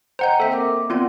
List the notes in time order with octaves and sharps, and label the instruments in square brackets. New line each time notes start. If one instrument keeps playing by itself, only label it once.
[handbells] C5 F#5 G6 [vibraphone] D#5 G5 A#5
[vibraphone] A#3 C4 [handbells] A4 E5 G5
[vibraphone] A#4 D6
[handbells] B3 C4 F4 [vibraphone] A#4 D5 F#5